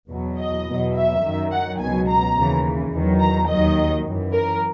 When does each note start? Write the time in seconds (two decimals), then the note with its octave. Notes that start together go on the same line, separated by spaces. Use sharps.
0.10 E2 B2 F#3
0.38 D#5
0.67 E2 B2 F#3
0.95 E5
1.23 F#2 D#3 F#3
1.51 F#5
1.79 C#2 B2 F#3 G#5
2.08 A#5
2.36 D#2 C#3 E3
2.92 E2 D#3 F#3
3.20 A#5
3.49 D#2 D#3 F#3 D#5
4.05 F#2 E3
4.33 A#4